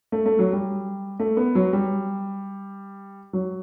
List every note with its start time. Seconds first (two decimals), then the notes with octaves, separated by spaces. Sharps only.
0.12 A3
0.26 A3
0.39 F#3
0.53 G3
1.20 A3
1.37 B3
1.55 F#3
1.73 G3
3.33 F#3